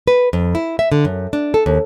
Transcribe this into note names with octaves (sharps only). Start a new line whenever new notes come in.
B4
F2
E4
E5
D3
F#2
D4
A4
D#2